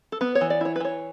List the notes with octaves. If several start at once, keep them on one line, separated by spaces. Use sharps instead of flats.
A4
B3 B4
C#5
E3
D5
E4 C#5
B4
E3 C#5